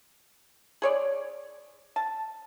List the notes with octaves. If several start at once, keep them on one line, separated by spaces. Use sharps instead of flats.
G#4 C#5 D5
A5